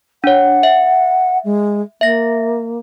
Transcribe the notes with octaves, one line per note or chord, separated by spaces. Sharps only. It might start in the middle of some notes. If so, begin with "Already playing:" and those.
D4 C#5 F#5
E5
G#3
A#3 E5 A#6